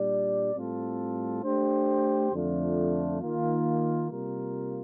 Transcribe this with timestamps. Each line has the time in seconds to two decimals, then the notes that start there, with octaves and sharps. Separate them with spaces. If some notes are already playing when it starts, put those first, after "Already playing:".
Already playing: A#2 G3 D4 G4 D5
0.54 A2 G3 C4 F4 A4
1.43 A3 D4 G4 C5
2.32 F2 D3 A3 D4 F4
3.20 D#3 A#3 F4
4.08 C3 G3 A#3 F4 A#4